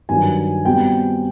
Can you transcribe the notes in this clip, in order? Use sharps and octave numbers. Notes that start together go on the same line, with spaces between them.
G2 D#3 F#3 G#5
B2 G3 C4 G5